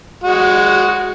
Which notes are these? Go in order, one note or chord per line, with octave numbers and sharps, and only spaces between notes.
G#3 F#4